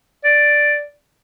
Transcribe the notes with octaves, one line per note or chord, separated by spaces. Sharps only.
D5